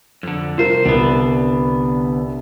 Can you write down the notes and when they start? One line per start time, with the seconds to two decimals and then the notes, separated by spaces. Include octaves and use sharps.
0.23 F2 D3
0.58 C2 F4 A#4 C5
0.85 C2 D3 B3